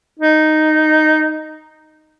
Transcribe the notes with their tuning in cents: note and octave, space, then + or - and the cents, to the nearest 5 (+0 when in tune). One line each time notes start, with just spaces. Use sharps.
D#4 -5